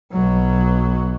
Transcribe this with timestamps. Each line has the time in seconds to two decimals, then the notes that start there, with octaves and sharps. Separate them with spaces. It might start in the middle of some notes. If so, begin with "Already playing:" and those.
0.12 B1 F#3